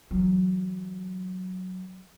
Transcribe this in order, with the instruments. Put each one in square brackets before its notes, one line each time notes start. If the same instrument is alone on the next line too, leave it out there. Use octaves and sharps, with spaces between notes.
[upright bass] E3 F#3